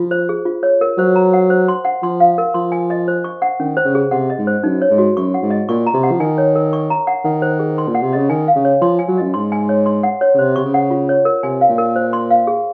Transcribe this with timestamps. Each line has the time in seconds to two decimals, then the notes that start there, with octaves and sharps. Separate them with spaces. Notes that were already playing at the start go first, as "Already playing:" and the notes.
Already playing: F3 F4
0.11 C5
0.29 G#4
0.46 F4
0.63 C#5
0.81 A#4
0.98 F#3 C5
1.16 A#5
1.33 F#5
1.50 C5
1.68 C6
1.85 F#5
2.02 F3 C6
2.20 F5
2.38 A#4
2.54 F3 C6
2.72 G#5
2.90 D#5
3.08 C5
3.24 C#6
3.42 F#5
3.60 D#3 C#4
3.77 C5
3.85 C#3
3.95 G#4
4.11 C3 F#5
4.30 D#5
4.38 G#2
4.47 C5
4.64 F#2 D#4
4.82 C#5
4.91 G#2
4.98 F#4
5.17 F#2 C#6
5.34 F#5
5.42 G#2
5.50 D#5
5.69 A#2 C#6
5.86 A#5
5.94 C3
6.03 F#5
6.11 F3
6.20 D#3 G#5
6.38 C#5
6.56 A#4
6.73 C#6
6.90 A#5
7.07 F#5
7.25 D#3 F#5
7.42 C5
7.60 G#4
7.78 C6
7.88 A#2
7.95 F#5
8.02 C3
8.13 C#3 D#5
8.30 D#3 G#5
8.48 F5
8.56 C#3
8.65 C#5
8.82 F3 C6
8.99 G#5
9.08 F#3
9.17 F#2 D#5
9.34 G#2 C6
9.52 G#5
9.69 C#5
9.86 C6
10.03 F#5
10.21 C#5
10.34 C#3
10.39 C3 C5
10.56 C3 C#6
10.65 C#3
10.74 F#5
10.90 F4
11.09 C#5
11.25 A#4
11.43 C3 G#5
11.61 F5
11.70 A#2
11.78 A#4
11.96 C5
12.13 C6
12.30 F5
12.47 G#4